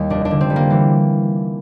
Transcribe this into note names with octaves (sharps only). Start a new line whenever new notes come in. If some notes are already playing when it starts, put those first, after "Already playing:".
Already playing: D#2 G3
F1 D4
D4
D3
C4
G3
A#3
E3